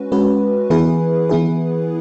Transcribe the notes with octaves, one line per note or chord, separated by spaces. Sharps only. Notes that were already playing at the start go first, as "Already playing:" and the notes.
Already playing: G#3 C#4 F#4 B4
G#3 C#4 F#4 B4
E3 B3 E4 G#4 B4
E3 B3 E4 G#4 B4